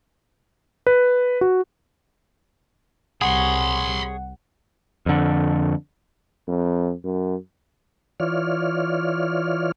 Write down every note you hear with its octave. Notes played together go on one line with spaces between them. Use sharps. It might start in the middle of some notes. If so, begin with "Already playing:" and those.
B4
F#4
C2 G3 G#4 C#5 F#5 B5 C6
F2 D3
F2
F#2
E3 F4 C#5 D5 F6